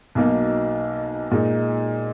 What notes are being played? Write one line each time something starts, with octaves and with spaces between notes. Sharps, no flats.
B1 B2 A#3 D#4
A#2 G#3 D#4